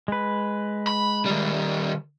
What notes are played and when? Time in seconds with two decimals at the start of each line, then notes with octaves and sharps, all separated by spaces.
0.08 G#3 B4
0.87 B5
1.26 D#3 G3